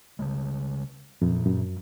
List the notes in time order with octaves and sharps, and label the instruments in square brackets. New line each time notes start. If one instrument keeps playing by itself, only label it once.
[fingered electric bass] C#3 G3 G#3
[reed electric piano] F2 [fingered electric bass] A#2 F#3
[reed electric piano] F#2